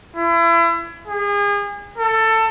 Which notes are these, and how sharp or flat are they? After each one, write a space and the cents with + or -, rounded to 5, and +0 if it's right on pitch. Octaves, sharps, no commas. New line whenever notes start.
E4 +35
G#4 -35
A4 +20